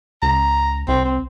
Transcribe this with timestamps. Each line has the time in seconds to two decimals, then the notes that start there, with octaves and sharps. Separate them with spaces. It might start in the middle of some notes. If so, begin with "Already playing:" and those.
0.22 C#2 A#5
0.88 C2 C4
1.05 C4